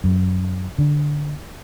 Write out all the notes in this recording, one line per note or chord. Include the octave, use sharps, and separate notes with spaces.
F#2
D3